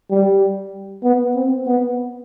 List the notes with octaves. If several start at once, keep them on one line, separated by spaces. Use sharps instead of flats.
G3
B3
C4
B3